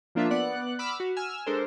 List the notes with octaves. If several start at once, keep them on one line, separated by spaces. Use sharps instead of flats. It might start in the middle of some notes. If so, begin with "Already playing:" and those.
F3 A#3 D4 F4 E5
B3 D5 F#5 F#6
B5 D6 E6 F6
F#4
G#5 E6 F6
G#3 D4 A4 A#4 C5